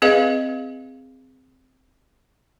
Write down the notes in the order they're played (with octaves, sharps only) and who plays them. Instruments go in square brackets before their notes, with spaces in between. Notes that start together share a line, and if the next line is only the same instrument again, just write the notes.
[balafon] C4 G#4 B4 D#5 F5